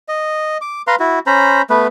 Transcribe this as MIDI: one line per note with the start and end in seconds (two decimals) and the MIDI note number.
0.08 0.58 75
0.61 0.82 86
0.87 0.95 71
0.87 0.95 77
0.87 0.95 82
0.87 0.95 84
1.00 1.19 64
1.00 1.19 66
1.27 1.62 61
1.27 1.62 72
1.27 1.62 82
1.27 1.62 83
1.70 1.87 57
1.70 1.87 59
1.70 1.87 71